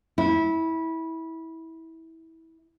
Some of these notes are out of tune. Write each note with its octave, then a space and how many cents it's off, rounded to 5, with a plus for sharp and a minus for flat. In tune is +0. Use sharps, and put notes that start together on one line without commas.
E4 -20